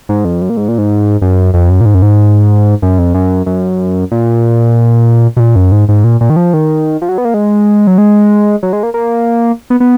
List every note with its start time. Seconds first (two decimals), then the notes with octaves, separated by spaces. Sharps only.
0.09 G#2
0.25 F2
0.42 F#2
0.50 A#2
0.57 G#2
0.68 A#2
0.78 G#2
1.22 F#2
1.54 F2
1.70 F#2
1.81 A#2
1.86 G#2
1.94 F#2
2.02 G#2
2.82 F#2
2.99 F2
3.14 F#2
3.46 F#2
4.11 A#2
5.37 B2
5.40 A#2
5.56 F#2
5.72 G#2
5.89 G#2
6.04 A#2
6.21 A#2
6.30 D#3
6.36 F3
6.54 D#3
7.02 F3
7.09 F#3
7.18 B3
7.25 A#3
7.34 G#3
7.87 F#3
7.98 G#3
8.63 F#3
8.73 G#3
8.83 A#3
8.94 A#3
9.70 B3
9.80 B3